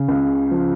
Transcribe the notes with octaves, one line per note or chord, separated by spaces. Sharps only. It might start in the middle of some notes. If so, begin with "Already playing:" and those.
Already playing: C#3
C#2
F3